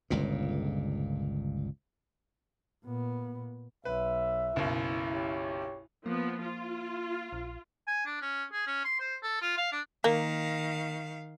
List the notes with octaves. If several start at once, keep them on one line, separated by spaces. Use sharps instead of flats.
G1 C#2 A#2
A#2 B3
B1 B4 E5
F#1 B1 E4
G4 C#5
F3 A#3 B3
F4
A#1
G#5
D4
C#4
G#4
C#4
C6
C5
A4
F4
F5
D4
D#3 A#3 F5